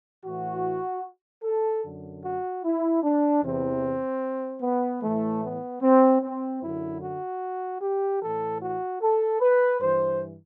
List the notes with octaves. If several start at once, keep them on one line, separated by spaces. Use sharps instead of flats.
A2 E3 F#4
A4
F#2 D3
F#4
E4
D4
E2 C3 E3 C4
B3
A2 E3 A3
B3
C4
C4
F#2 D3 E4
F#4
G4
A2 E3 A4
F#4
A4
B4
G2 E3 C5